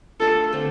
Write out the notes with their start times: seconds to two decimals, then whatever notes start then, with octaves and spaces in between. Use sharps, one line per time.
0.20 A3 D4 F4 A4
0.53 D3 A3 C4